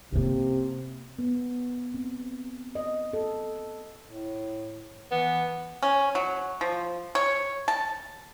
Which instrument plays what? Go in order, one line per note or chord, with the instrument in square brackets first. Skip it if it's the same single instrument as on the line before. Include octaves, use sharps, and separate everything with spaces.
[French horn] C3 [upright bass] A#3 C#4
[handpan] B3
C4
D#5
A4
[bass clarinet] A2
[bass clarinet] E3 [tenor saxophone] B3
[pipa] C#4
F#3
F3
C#5
A5